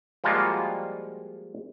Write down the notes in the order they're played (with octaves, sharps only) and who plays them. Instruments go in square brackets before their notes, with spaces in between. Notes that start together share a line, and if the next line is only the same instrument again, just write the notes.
[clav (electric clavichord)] F3 G3 G#3 A#3 F4 F#4